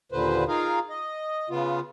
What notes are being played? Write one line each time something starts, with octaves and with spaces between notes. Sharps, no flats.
D#2 A#2 D3 B4 C5
D#4 F4 G#4 A#4 F5
D#5
C#3 B3 F4